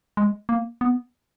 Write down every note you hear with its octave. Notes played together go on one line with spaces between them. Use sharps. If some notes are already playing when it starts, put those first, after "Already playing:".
G#3
A#3
B3